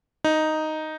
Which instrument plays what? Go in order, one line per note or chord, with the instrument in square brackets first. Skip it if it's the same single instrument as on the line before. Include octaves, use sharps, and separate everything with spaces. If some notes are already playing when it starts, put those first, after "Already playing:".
[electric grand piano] D#4